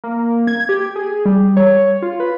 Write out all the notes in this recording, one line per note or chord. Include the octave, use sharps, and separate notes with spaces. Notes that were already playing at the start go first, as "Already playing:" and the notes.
A#3
G#6
G4
G#4
G3
C#5
F4
B4